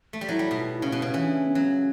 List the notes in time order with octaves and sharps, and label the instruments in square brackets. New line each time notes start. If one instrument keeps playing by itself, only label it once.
[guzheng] A3
G3
[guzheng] F#3 [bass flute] E4
[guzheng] G3
B2
[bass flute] E4
E4
[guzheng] C#3
[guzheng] B2 [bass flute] E4
[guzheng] C#3
[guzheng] E3 [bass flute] E4
[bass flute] D4
B3
[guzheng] F#3 [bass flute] C#4